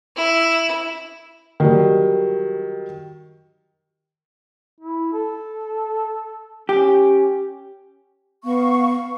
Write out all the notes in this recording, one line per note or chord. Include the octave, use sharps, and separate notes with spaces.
E4
D#3 F#3 G3
E4
A4
C#4 G4
B3 F5 C#6